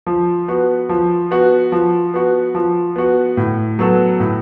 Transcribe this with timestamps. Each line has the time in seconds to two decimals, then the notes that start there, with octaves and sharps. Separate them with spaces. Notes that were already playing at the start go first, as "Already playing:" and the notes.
0.06 F3
0.48 B3 F#4
0.89 F3
1.31 B3 F#4
1.72 F3
2.14 B3 F#4
2.55 F3
2.96 B3 F#4
3.37 A2
3.79 F#3 B3 F#4 A4
4.20 A2